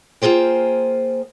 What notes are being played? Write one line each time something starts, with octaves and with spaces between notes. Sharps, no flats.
A#3 F4 G#4 C5 G5